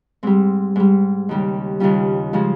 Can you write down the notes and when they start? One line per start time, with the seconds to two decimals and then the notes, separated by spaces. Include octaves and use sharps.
0.23 G#2 G3 C4
0.76 G#2 G3
1.29 D#2 C#3 G3
1.80 D#2 C#3 G3 C#4 F4
2.33 C#3 F3 G#3